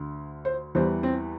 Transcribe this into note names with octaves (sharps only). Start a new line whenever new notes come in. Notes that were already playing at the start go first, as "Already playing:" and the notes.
Already playing: D2 D3
C5
E2 E3 G3 C5
C4